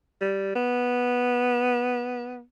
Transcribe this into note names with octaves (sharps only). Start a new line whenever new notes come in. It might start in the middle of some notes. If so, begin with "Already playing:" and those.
G3
B3